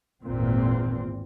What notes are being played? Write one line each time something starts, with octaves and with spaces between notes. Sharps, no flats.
G#1 E2 A#2 C4